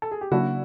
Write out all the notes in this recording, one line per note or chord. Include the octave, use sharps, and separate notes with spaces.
A4
G#4
G4
C#3 F#3 A#3 D4 E4 F#4